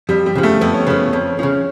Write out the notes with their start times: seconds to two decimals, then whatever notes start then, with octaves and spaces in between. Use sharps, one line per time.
0.09 F2 G3
0.26 G3
0.35 C#3 F3
0.43 A3
0.61 F2 B3
0.74 C#4
0.87 C#3 F3 B3
1.12 F2 C#4
1.39 C#3 F3 C#4